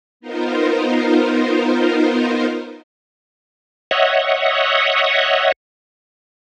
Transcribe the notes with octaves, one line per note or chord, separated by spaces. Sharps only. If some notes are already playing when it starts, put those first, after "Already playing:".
B3 D#4 F4 A#4 C5
C#5 D#5 E5 F#5